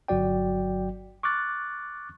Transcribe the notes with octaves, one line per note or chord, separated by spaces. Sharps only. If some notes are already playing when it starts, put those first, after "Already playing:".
G1 F#3 F#4 D5 G5
C#6 D6 F6 F#6 A6